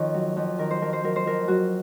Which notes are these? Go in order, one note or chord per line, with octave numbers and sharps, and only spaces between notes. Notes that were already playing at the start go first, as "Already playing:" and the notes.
Already playing: F2 D#3 C#5
F#3
F2
D#3 A#4
C5
F2 A#4
C5
F#3 A#4
C5
F2 A#4
F#3 F#4